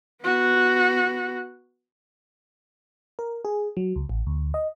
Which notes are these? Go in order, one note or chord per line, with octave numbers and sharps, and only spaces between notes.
B3 F#4
A#4
G#4
F#3
C#2
A1
D2
D#5